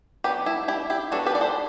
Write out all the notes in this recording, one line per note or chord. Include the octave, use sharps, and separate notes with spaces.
F#3 B3 D4 G4 B4
E4
E4 G4
E4 G4
F#3 B3 D4 F#4 A4
G4 B4
D5
A4 C5